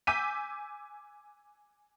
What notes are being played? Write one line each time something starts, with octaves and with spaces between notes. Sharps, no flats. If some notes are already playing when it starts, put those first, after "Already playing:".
G#5 D6 E6 G6 B6 D#7